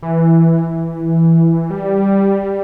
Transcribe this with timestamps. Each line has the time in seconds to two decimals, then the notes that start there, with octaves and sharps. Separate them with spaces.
0.03 E3
1.70 G3